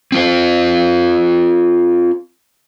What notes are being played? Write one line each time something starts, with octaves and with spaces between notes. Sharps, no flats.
C4 F4 C5